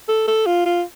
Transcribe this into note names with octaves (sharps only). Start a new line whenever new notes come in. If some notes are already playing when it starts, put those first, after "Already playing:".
A4
A4
F4
F4